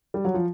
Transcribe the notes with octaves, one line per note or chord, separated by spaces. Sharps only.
G3
F#3
F3